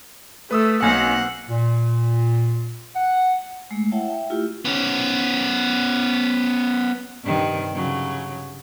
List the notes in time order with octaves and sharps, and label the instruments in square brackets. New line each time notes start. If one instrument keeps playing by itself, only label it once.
[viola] A3 [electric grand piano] B4 D#6 E6
[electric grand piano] B1 G#5 [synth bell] A#3 C4 [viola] F#5
[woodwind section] A#2
F#5
[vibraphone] G#3 A3
E4 C#5 E5 F#5 G5 A5
E5 G5
A3 E4 F4 G4
[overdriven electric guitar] B3 C#4
[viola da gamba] G2 C3 D#3
C#3 F#3